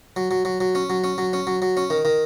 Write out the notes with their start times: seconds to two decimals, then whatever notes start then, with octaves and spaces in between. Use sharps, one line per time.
0.16 F#3
0.31 F#3
0.45 F#3
0.60 F#3
0.75 C#4
0.90 F#3
1.04 C#4
1.18 F#3
1.33 C#4
1.47 F#3
1.62 F#3
1.77 C#4
1.90 D#3
2.05 D#3